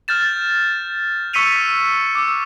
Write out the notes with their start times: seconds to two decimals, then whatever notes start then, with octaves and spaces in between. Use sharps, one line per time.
0.08 F6 G6 A6 E7
1.33 C#6 E6 B6 C#7 D#7 F7
2.15 D6 E6